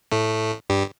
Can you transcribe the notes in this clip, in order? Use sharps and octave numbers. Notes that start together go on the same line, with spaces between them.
A2 A3
G2 G3